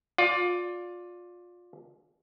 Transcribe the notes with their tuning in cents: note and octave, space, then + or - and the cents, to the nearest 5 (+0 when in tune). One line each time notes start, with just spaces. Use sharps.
F4 +25 D5 -5